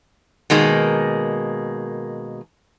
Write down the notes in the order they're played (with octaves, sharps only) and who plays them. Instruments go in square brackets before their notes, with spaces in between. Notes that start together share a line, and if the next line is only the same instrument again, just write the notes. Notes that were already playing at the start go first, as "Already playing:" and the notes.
[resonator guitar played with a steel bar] B2 D#3 G#3 A#3